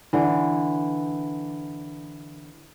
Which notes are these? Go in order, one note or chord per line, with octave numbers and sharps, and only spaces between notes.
D3 E3